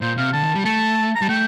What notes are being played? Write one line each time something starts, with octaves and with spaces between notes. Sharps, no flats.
A#2 C5
C3 F5
D3 A5
D#3
G3
A3 A5
A#5
G3 A5
A3 G5